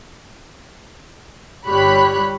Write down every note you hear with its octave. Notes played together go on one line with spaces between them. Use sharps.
G1 G3 G4 C#5 B5 F#6